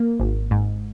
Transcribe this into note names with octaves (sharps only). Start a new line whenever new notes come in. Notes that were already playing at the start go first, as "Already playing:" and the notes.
Already playing: A#3
G#1
G#2